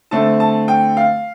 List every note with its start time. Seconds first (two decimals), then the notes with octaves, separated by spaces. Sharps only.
0.11 D3 A3 C4 A5
0.40 A5
0.68 G5
0.97 F5